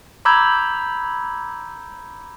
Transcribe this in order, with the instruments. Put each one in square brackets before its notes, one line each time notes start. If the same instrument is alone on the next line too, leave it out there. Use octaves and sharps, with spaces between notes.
[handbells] A#5 B5 D6 E6 G6 G#6